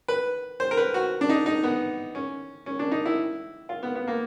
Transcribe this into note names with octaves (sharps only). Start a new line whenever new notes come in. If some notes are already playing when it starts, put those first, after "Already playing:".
B4
C5
A#4
B4
F#4
D4
D#4
D#4
B3
C#4
C#4
D4
D#4
E4
F4
B3
B3
A#3